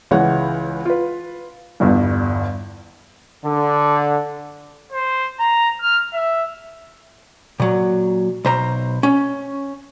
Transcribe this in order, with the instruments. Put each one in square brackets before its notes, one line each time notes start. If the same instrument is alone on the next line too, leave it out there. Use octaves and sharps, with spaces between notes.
[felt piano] C#2 E3 G#3 C#5 F#5
F4 B4
G1 E2 G2
[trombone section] D3
[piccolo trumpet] C5
A#5
F6
E5
[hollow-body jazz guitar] A#2 F#3
B1 C5 A#5
C#4